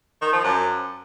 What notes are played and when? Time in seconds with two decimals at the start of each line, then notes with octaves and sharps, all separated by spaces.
0.22 D#3
0.33 F3
0.44 F#2